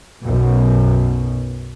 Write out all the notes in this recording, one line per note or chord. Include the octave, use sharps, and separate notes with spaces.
B1 F#2 B2